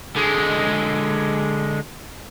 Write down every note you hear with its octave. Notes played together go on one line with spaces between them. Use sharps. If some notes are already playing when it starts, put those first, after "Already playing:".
D3 G#3